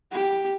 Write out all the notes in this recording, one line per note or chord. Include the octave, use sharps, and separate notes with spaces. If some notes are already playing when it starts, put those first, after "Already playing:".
G4